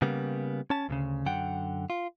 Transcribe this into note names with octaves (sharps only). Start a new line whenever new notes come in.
C#3 G3 A#3 B3
C#4 A5
D2 A#2 C#3
F#2 D3 F#5 G5
F4